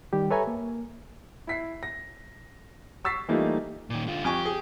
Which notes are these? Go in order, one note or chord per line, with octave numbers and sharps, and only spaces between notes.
D#3 G3 G4
A4 B4 C#5 E5 G#5 A#5
A#3
E4 B6 C7
A#6
C#6 E6 A6 B6 C7
E3 G3 A3 A#3 D#4 F4
A#2 D#3
D3 F4
F2 G4 G#5 C#6
G#4